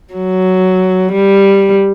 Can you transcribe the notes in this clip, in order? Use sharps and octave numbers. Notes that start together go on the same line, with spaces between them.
F#3
G3